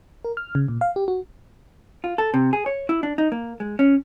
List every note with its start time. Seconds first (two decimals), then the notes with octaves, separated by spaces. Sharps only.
0.25 A#4
0.37 F6
0.55 C#3
0.68 A#2
0.81 F5
0.96 G4
1.08 F#4
2.04 F4
2.18 A4
2.34 C3
2.53 G#4
2.66 C#5
2.89 E4
3.03 D4
3.18 D#4
3.32 A#3
3.60 G#3
3.79 C#4